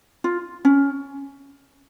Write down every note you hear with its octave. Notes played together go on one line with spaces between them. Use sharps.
F4
C#4